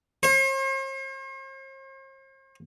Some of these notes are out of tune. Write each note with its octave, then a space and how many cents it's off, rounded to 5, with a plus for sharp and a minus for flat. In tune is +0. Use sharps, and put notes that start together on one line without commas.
C5 +45